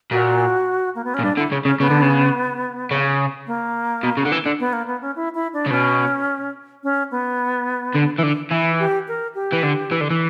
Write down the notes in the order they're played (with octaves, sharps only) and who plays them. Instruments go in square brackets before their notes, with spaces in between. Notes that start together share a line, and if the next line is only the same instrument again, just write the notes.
[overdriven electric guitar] A#2 [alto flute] F#4
[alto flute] A#3
B3
C#4
[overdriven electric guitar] A#2
[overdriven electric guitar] G2 [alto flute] D4
[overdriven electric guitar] D3 [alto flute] E4
[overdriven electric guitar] C#3
[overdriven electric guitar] C#3 [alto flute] C#4
[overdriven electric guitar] C#3 [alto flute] B3
[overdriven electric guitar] D3
C#3
C#3
[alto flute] A#3
[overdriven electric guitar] B2
C#3
D3
E3
D3
[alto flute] B3
A#3
B3
C#4
E4
E4
D4
[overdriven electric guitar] C#3
[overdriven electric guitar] B2 [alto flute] C#4
[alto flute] C#4
B3
[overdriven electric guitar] D3
E3
D3
[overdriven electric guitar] E3 [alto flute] E4
[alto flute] G4
A#4
G4
[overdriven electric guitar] E3
D3
E3
D3
E3